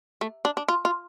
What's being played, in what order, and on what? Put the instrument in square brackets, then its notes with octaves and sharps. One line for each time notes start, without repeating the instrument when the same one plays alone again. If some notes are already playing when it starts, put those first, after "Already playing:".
[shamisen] A3
D4
D4
F4
F4